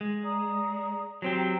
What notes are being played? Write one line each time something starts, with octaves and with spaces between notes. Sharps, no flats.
G#3
D5 A#5 D#6
F#3 C4 G4
G5 A#5